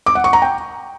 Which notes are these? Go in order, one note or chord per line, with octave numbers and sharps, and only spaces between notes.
D6
F#5
C#6
A#5
G5